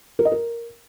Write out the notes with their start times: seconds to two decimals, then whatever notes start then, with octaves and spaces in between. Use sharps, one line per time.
0.19 A#4
0.25 D#5
0.32 A#4